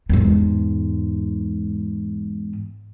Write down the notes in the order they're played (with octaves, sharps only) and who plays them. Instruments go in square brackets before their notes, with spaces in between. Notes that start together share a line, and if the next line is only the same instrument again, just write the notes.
[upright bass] E2 G#2